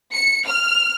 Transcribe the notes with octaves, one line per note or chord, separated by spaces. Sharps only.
C#7
F6